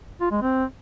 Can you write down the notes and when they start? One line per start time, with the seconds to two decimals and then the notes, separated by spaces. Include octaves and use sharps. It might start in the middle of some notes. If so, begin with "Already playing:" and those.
0.21 F4
0.31 G#3
0.42 C4